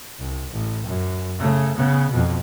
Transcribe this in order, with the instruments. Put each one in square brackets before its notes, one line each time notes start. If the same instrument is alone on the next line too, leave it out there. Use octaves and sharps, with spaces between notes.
[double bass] C2
A1
F#2
C#3 A3
C#3 B3
F2 B2